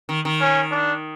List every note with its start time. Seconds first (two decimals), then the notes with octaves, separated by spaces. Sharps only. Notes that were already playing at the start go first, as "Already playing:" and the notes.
0.09 D#3
0.25 D#3
0.40 C#4
0.71 D4